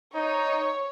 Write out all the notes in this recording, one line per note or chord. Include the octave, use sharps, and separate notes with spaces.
D#4 C#5